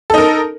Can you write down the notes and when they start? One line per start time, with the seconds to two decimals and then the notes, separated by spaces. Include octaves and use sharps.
0.10 A4
0.14 D#4
0.18 A#4